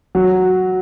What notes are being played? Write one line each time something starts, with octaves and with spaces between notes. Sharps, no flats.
F#3